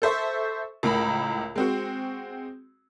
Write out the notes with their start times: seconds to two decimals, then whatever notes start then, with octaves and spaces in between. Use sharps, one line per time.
0.02 A4 C5 E5 C#6
0.83 C#2 A2 A#4 A#5 B5
1.55 G#3 C4 F#4